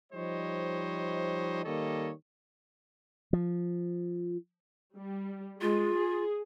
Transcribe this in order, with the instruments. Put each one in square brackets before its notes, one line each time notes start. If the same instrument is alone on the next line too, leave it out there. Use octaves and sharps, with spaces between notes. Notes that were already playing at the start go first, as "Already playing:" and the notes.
[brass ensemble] F3 G3 D#4 C5 C#5 D#5
D#3 G3 A#3 A4 C#5 D#5
[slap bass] F3
[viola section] G3
[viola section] G#3 [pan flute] F4
[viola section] G#4